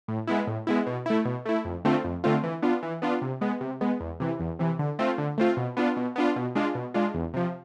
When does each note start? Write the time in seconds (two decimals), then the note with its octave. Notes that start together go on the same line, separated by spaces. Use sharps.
0.08 A2
0.27 G#3 B3 E4
0.47 A2
0.67 G#3 B3 E4
0.87 B2
1.06 A3 E4
1.25 B2
1.46 A3 E4
1.65 F2
1.85 D3 A3 C4 F4
2.04 F2
2.24 D3 A3 C4 F4
2.44 E3
2.62 B3 D4 F4
2.83 E3
3.02 B3 D4 F4
3.22 C3
3.41 G#3 B3
3.61 C3
3.81 G#3 B3
4.00 E2
4.20 C3 E3
4.40 E2
4.59 C3 E3
4.79 D3
4.99 A3 C4 F4
5.18 D3
5.38 A3 C4 F4
5.57 B2
5.77 B3 D4 F4
5.97 B2
6.16 B3 D4 F4
6.36 B2
6.55 G#3 D4 F4
6.75 B2
6.94 G#3 D4 F4
7.14 E2
7.34 C3 F3